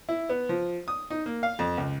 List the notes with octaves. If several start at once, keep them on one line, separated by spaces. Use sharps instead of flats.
E4
B3
F3
D#6
D#4
A#3
F5
F2
C#2